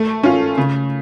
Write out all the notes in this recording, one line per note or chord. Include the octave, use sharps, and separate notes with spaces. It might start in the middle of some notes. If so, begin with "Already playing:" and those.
Already playing: A3
C#4 F4
C#3